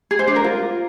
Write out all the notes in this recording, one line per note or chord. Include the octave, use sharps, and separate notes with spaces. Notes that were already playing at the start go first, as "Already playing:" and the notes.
G#4
C5
D4
A#4
F4